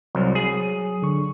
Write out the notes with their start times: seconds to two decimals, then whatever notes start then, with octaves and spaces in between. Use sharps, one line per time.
0.15 C2 F#3
0.35 G#4
1.02 D3 C#6